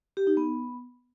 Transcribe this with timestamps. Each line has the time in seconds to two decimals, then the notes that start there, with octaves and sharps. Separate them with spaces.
0.17 G4
0.27 D#4
0.37 B3